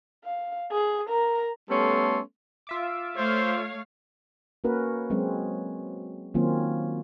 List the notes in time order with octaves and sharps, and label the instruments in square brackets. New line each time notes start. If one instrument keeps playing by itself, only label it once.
[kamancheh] F5
G#4
A#4 A#5
[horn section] G3 A3 B3 C#4 A4 C6
[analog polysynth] F4 E5 D6
[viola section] A3 C#5 F5 [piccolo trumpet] C5
[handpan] A#3 C#4 F#4 A#4 B4
F#3 G#3 C4 C#4
D#3 F#3 A#3 C4 C#4 F4